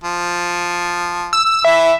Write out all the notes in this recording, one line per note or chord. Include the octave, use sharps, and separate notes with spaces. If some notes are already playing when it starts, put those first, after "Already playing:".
F3
E6
E3 E5